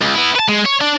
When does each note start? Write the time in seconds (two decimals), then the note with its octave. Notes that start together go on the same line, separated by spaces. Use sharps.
0.02 C#2
0.15 B3 E4
0.36 B4 A5
0.48 G#3
0.65 C#5
0.81 D4